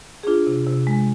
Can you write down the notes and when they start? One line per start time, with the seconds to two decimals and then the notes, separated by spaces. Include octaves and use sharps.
0.23 G#4
0.27 D4 F4
0.47 C3
0.67 C3
0.87 G#3